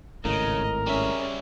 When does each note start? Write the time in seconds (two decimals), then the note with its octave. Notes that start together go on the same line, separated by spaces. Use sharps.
0.25 G#1 A2 C#3 A#4 D#5
0.87 G3 C#4 G#4 E5